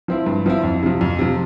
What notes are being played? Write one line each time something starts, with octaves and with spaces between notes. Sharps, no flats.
F3 C4 E4
G2
F3 C4 E4
F2
C3 F3
F2
C3 F3